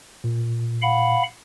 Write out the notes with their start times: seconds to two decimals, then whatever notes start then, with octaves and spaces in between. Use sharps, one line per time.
0.24 A#2
0.82 F5 F#5 B5